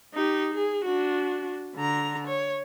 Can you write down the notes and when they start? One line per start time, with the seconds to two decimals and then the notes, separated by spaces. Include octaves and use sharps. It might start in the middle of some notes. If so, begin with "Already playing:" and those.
0.14 D#4 G4
0.54 G#4
0.85 D4 F#4
1.75 D3 A#5
2.27 C#5